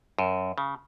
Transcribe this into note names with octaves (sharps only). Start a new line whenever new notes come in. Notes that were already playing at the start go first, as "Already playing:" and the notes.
F#2
C#3